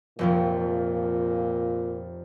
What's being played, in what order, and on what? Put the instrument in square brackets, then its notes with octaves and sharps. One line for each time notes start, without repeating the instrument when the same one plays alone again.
[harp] F1 F2 F3 [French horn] A#2